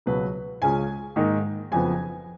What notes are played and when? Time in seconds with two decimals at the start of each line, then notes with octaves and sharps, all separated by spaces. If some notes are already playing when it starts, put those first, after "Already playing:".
0.06 C#2 B2 F#3 B4
0.62 C#2 C#3 G#3 C#4 F4 G#5
1.16 G#2 D#3 A#3 D#4
1.72 F#1 F2 F3 B3 G#5